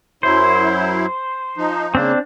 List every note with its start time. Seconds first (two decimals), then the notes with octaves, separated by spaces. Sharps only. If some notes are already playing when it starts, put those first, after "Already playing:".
0.23 F#2 F#3 E4 C5
1.57 F3 D#4
1.95 C#3 A#3 C4 D4